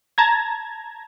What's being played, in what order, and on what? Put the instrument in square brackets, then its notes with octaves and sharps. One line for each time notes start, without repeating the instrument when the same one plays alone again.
[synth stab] A5 A#5 G#6